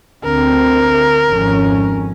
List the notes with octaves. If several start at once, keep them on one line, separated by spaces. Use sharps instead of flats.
D2 D3 C4 A#4
G#1 F2 C#4